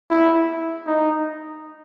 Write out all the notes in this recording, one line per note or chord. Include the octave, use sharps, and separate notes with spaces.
E4
D#4